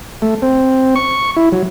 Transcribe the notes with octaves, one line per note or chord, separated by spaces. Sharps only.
A3
C4
C#6
E4
F#3